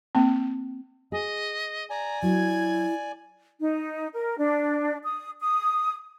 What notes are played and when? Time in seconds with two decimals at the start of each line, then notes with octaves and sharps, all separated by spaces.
0.15 A#3 C4
1.12 G#4 D#5
1.90 D5 G#5 A#5
2.22 F#3 E4 G#6
3.60 D#4
4.13 A#4
4.38 D4
5.03 D#6
5.40 D#6